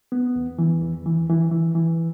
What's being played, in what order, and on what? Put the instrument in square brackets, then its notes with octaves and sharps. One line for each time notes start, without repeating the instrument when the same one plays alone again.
[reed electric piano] B3
E2
E3
E2
E3
E3
E3
E3